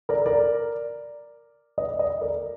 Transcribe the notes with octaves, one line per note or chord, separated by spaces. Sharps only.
A#4 D5
A#4 D5
B4 D#5
D5
B4 D#5
A#4 D5